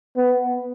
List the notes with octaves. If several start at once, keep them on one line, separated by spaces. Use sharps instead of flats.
B3